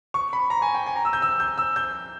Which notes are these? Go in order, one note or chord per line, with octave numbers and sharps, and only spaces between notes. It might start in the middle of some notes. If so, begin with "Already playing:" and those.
C#6
B5
A#5
G#5
G5
G#5
A#5
E6
G6
E6
G6
E6
G6